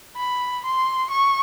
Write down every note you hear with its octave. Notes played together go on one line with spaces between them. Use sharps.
B5
C6
C#6